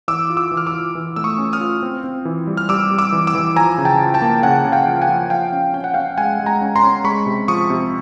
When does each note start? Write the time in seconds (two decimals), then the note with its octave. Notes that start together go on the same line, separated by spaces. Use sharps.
0.08 E3 D6 E6
0.30 F4
0.37 D6 E6
0.51 E3
0.57 F6
0.66 D6 E6
0.74 F4
0.95 E3
1.16 A3 E6
1.24 C#6 D#6
1.38 C#4
1.53 D#6 F6
1.61 F4
1.83 C4
2.04 C4
2.25 E3
2.47 G3
2.57 F6
2.69 G3 D6 E6
2.91 G3
2.98 D6 E6
3.12 E3
3.27 D6 E6
3.35 E3
3.56 F3 G#5 A#5
3.78 C#3
3.85 G5 A5
4.00 F3
4.14 G5 A5
4.22 A#3
4.43 C#3 F#5 G#5
4.65 C#3
4.72 F5 G5
4.87 F3
5.02 F#5 G#5
5.09 F3
5.30 F3 F5 G5
5.52 C#4
5.74 C#4 G5
5.84 F#5
5.94 C#4 F5 G5
6.17 G#3 F#5 G#5
6.39 G#3
6.46 G#5 A#5
6.61 C#4
6.76 A#5 C6
6.83 C#4
7.04 G#3 B5 C#6
7.26 C3
7.48 F3 C#6 D#6
7.70 C3